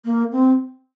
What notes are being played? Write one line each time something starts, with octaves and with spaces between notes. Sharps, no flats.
A#3
C4